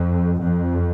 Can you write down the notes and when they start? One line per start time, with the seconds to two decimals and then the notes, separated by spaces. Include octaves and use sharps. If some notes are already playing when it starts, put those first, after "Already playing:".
Already playing: F2
0.40 F2